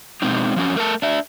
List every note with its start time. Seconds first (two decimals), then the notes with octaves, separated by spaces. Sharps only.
0.22 B2 G#3 C4 D#4
0.56 F3 F#3 C#4
0.76 A3 A#4 A5
1.02 D4 E5